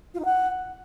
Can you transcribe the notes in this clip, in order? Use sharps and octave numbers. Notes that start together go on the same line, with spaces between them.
F4
D#4
F#5